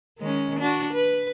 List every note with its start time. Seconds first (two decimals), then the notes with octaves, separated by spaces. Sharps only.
0.18 D#3 G#3 C#4
0.59 D4 F#4
0.93 B4